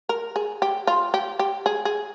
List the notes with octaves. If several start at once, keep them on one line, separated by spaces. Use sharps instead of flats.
A#4
G#4
G4
F4
G4
G4
G#4
G#4